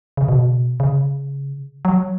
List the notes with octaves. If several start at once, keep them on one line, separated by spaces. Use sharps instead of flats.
C#3
B2
C#3
F#3